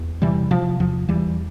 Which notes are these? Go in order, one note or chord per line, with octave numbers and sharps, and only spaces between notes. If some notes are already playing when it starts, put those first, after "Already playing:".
Already playing: E2
C3 E3 G3
C3 F3
E2 F3
E2 E3 G3